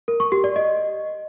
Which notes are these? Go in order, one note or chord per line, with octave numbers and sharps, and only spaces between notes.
A#4
C#6
G4
D5
D#5